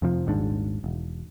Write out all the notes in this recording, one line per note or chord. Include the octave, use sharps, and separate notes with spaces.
F2 C3 F3
D#1 G#1 G#2 D4
E1